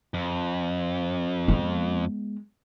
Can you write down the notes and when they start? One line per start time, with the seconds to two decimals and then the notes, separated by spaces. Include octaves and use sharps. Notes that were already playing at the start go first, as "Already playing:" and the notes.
0.14 F2
1.48 G#3 B3